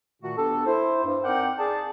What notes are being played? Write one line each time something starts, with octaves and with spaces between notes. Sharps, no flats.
A#2 D#3 A3 F#4
B3 D4 G4 A4
E4 C5
G2
C4 D#4 A#4 D5 F#5 G5
G#4 D5 A5